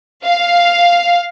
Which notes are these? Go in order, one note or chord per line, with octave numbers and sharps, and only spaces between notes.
F5